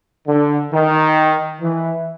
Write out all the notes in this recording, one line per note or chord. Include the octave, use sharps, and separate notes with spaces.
D3
D#3
E3